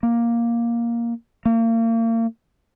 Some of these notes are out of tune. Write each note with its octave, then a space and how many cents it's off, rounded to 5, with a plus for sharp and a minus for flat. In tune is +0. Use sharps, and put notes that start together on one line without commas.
A#3 +5
A#3 -35